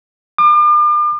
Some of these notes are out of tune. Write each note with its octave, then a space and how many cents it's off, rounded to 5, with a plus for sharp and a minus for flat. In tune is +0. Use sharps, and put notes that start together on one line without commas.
D6 +40